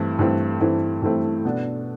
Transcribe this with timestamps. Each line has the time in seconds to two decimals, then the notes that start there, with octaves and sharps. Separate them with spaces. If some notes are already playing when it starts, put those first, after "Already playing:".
Already playing: G2 E3 A3 C4 E4
0.19 G2 E3 A3 C4 E4
0.61 G2 E3 A3 C4 E4
1.02 G2 E3 A3 C4 E4
1.45 B2 B3 D4 A4